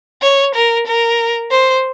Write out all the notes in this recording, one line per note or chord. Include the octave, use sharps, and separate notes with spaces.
C#5
A#4
A#4
C5